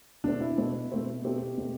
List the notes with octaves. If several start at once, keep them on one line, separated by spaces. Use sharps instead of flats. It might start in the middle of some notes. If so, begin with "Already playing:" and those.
B2 A3 C4 D4
E4
B2 A3 C4
B2 A3 C4
B2 A3 C4 G4
B2 A3 C4